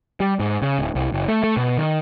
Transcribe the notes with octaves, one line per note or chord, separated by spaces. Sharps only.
G3
G#2
C#3
D1
C2
F#1
A3
A3
B2
D#3